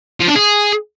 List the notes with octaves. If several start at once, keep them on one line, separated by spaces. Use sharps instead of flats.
F3
D4
G#4